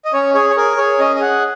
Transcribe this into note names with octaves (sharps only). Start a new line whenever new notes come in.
D#5
C#4 C#5
G#4 C#5
C#5
G#4 A#4
G#4 C#5
C#4 D#5
D#5
G#4 F#5